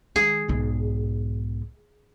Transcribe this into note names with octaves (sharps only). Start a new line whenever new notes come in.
D#3 G#3 G#4
B1 G#2